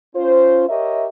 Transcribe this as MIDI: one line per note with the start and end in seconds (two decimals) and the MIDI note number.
0.16 0.67 61
0.16 0.67 65
0.16 0.67 72
0.69 1.07 67
0.69 1.07 70
0.69 1.07 73
0.69 1.07 75
0.69 1.07 76